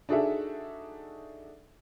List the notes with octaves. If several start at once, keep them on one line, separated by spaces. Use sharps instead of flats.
D4 D#4 F#4 G#4 A4 E5